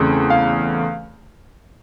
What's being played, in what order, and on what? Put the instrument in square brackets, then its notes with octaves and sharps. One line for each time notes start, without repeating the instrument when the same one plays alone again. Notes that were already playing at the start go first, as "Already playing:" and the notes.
Already playing: [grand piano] E2 C#3 A3 C4
F5